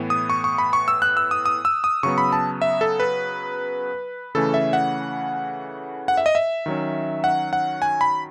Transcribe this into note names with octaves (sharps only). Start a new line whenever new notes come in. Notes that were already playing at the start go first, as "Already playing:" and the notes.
Already playing: A2 E3 B3
D#6
C#6
C#6
B5
C#6
E6
F#6
E6
D#6
D#6
E6
D#6
C#3 F#3 B3 C#6
B5
A5
E5
A4
B4
C#3 E3 A3 C#4 A4
E5
F#5
F#5
E5
D#5
E5
D#3 F#3 C#4
F#5
F#5
G#5
B5